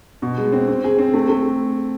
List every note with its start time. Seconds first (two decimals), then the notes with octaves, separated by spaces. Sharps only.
0.22 B2
0.38 G#3
0.52 C4
0.68 C4
0.84 G#4
0.98 C4
1.14 A3
1.29 A3